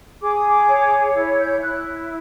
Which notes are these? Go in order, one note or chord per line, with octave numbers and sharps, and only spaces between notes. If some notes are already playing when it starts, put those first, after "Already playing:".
G#4 D6
D#6
D6
C#5
E4
G6
E4 F#6